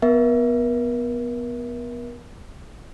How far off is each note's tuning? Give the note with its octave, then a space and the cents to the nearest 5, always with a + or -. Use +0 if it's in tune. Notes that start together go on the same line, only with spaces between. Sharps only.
B3 +0 A#4 +35 E5 +0